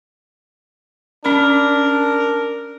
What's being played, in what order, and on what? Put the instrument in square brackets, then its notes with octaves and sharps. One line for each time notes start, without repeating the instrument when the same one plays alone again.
[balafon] C#4 B5 [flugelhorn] D4 [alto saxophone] A#4